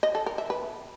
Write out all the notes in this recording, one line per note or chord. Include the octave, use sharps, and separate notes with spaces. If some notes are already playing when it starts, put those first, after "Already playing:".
D#5
A4
A#4
E5
B4